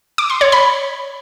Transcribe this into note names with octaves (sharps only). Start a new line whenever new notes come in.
D6
C6
C#5
B5